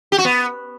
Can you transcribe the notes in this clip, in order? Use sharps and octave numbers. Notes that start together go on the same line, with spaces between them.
G4
F#4
B3